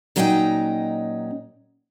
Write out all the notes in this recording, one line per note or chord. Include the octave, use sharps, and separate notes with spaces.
A#2 F#3 C#4 D#4 D#5 G5